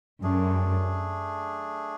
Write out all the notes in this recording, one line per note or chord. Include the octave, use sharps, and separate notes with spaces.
F#2 A3 D4 G#4